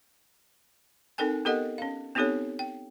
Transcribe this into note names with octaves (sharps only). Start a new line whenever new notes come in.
C4 D#4 A4 A#4 G5 G#5
B3 G4 A4 A#4 D#5 F#5
C#4 F5
B3 C4 D#4 G4 A4 C#5
G5